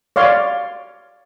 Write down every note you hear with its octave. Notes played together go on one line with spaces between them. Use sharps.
C#5 D5 F5 C6